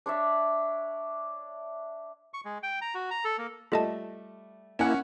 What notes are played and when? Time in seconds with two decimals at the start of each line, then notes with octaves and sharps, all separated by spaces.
0.06 D4 C#5 D5 E5
2.34 C#6
2.45 G#3
2.63 G5
2.81 A#5
2.95 F#4
3.11 A#5
3.25 A4
3.38 A#3
3.72 G3 A3 F4 D#5 E5 A5
4.79 A#3 C#4 E4 F#5